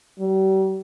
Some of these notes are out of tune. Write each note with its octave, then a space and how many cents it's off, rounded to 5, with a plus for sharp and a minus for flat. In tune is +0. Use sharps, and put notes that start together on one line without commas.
G3 -40